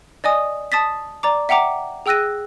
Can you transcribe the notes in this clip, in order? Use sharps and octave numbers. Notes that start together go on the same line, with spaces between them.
D5 D#5 G#5 D#6
A5 D#6 A6 B6
D5 A#5 D6
E5 F#5 G5 A#5 D6
G#4 G5 E6 F#6 A#6 D#7